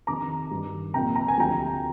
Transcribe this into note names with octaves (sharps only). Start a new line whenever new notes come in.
F2 C3 D#3 A#5 D6
G2 D#3
C2 A#2 F3 G5 A#5
A#5
G#5
D2 C3 F3 G5 A#5